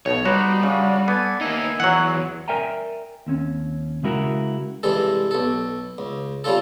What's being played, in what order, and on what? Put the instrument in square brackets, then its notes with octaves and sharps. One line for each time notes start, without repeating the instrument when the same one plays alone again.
[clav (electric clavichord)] B1 B2 [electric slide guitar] C#5
[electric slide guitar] G3 [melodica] B3 D#4 C5 [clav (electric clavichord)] F#4
[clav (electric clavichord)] C#3 [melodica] D4 F#4
[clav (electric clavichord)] B3 [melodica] A4 D5 G#5
[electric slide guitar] A#3 D#4 [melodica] E5 G#5
[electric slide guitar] E2 [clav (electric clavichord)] F#3 F#5
[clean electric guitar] A#4 D5 E5 G5 G#5 A#5
D#2 C4 C#4
C#3 G#3 E4 F#4 A#4
[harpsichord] G2 C3 E3 G#3 A4
B1 A4
C#2
C3 G3 C#4 F4 A4